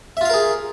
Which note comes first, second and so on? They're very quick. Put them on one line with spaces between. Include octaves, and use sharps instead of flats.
E5 F4 F5 A#4 G#4